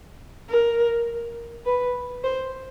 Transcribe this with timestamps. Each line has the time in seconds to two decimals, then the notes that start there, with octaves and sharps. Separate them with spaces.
0.49 A#4
1.66 B4
2.24 C5